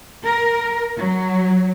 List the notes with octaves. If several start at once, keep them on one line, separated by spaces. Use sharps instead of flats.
A#4
F#3